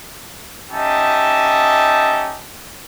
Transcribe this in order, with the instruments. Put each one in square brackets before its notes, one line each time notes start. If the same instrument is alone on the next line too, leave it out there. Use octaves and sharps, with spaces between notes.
[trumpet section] C#4 D#4 G4 D#5 E5 A5